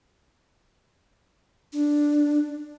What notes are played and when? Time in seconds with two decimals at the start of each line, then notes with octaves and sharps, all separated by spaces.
1.73 D4